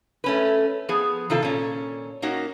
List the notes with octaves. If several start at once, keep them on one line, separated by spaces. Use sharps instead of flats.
A3 C#4 B4
F3 B3 G#4
C3 D#3 F4 A4
A#2 C#4
A#3 C#4 D#4 F#4